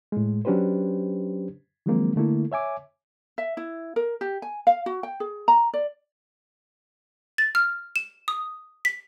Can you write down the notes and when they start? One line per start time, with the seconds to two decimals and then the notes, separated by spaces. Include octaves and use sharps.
0.12 A2 G#3
0.45 F#3 C#4 D4 G4 B4 C5
1.86 D#3 F3 F#3 G#3 A#3 C4
2.16 D3 A3 A#3 E4
2.52 C#5 E5 G#5 D6
3.38 E5
3.57 E4
3.96 A#4
4.21 G4
4.42 G#5
4.67 F5
4.86 F#4
5.03 G5
5.20 G#4
5.48 A#5
5.74 D5
7.38 A6
7.55 F6
7.96 E7
8.28 D#6
8.85 B6